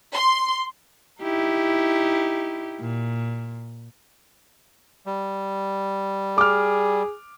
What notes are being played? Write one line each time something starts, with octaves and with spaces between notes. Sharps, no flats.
C6
D#4 E4 G4
A#2
G3
G#4 D6 F6